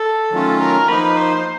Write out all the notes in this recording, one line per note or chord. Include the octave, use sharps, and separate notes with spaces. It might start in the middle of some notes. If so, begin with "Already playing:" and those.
Already playing: A4
D#3 F#3 A3 C#4 F4
A#4
F3 A#3 D#4 B4
C5